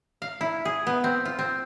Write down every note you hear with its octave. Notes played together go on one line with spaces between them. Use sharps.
F5
E4
G#4
B3
C4
F4
C4